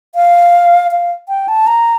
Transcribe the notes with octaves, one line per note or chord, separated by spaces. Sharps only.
F5
F5
G5
A5
A#5